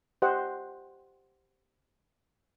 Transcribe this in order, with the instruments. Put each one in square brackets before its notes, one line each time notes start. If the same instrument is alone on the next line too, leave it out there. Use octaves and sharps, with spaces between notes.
[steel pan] G4 C5 D#5 F#5